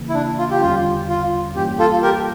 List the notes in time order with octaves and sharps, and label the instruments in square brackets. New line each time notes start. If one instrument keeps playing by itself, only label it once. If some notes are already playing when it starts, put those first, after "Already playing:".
Already playing: [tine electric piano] C#3 E3 A#3
[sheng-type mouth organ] E4
D4
F4
G4
[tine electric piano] E2 D3 G3 C#4 [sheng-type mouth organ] F4
[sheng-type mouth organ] F4
[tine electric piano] G2 E3 G3 A#3 C#4 [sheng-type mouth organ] G4
[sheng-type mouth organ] F4 A4
G4 A#4